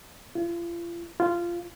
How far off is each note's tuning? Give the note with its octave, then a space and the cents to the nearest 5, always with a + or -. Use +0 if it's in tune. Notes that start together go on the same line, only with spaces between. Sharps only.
F4 -40
F4 -15